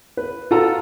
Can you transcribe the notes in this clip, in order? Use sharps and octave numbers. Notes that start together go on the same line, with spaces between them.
B4
F4 F#4 A4 A#5